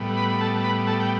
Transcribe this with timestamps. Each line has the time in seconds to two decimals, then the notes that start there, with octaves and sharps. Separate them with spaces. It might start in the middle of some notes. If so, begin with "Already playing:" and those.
Already playing: A2 G3 B3
0.17 B4 B5
0.30 B5
0.41 A4 A5
0.56 A5
0.64 B4 B5
0.87 A4 A5
1.00 G5